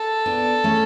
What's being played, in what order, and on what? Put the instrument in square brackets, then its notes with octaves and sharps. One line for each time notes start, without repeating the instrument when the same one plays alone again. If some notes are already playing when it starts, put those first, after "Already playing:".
Already playing: [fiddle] A4
[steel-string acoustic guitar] B3 D4
A3 C#4